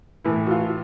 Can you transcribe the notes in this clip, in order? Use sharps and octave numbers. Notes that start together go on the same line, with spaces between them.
A2 E3 E4
F#4
F4